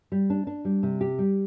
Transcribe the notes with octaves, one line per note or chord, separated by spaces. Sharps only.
G3
D4
D4
G3
C3
G4
G3